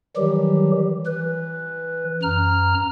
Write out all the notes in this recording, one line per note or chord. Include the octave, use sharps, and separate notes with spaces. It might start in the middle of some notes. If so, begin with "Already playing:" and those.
D#3 E3 F#3 G3 G4
E3 B4
F#2 A#5 F6